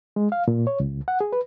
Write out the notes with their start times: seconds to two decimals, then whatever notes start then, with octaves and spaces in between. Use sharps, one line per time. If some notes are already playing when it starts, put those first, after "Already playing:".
0.16 G#3
0.32 F5
0.48 A#2
0.67 C#5
0.80 C#2
1.08 F#5
1.21 G#4
1.33 B4